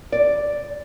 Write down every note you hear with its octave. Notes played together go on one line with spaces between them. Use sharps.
D5